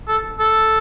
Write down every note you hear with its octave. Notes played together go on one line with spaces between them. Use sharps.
A4
A4